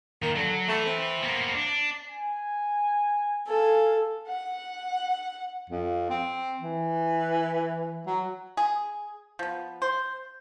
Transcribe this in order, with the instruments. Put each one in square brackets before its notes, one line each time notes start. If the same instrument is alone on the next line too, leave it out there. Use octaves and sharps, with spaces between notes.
[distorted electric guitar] D#3 [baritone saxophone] A#3
[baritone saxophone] D3 [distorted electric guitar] F#3
[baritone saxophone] A3 [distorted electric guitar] B4 E5
[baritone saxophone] C4
[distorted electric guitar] A#3 B3
D4
[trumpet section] G#5
[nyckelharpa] A4 [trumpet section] F5 G#5
[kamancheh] F#5
[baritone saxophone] F2
C4
E3
F#3
[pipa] G#4
F3 B3
C5